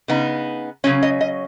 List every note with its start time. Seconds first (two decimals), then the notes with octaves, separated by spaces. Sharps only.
0.08 C#3 B3 D#4
0.84 C#3 F#3 C#4 C#5
1.03 D#5
1.21 D#5